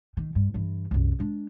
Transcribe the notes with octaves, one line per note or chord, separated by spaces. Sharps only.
D#3
G2
G2 E3
C2 F#2
G#3 D4